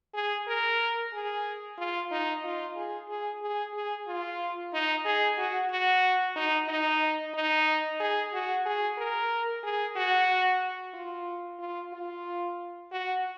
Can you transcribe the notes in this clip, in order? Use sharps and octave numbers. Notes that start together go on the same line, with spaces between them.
G#4
A#4
G#4
F4
D#4
F4
G#4
G#4
G#4
G#4
F4
D#4
G#4
F#4
F#4
D#4
D#4
D#4
G#4
F#4
G#4
A#4
G#4
F#4
F4
F4
F4
F#4